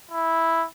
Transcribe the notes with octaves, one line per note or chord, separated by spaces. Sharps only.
E4